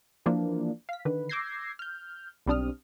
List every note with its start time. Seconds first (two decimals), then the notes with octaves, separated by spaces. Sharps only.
0.26 E3 F3 A#3 D4
0.89 F5 B6
1.05 D3 D#3 B4
1.29 D6 E6 G6 G#6 A#6 C7
1.79 F6 G6
2.46 B1 G3 C4 D4 D#6 F6